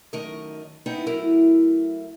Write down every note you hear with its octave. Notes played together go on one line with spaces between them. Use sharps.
F#2 D#3 A3 A#4 D#5
B3 C4 D#4 E4 D#5
F#3 A3 E4 A#4